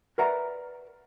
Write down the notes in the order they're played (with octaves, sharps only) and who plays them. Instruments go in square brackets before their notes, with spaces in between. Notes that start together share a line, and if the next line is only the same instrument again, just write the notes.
[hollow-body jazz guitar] A#4 B4 D5 E5 F#5 A#5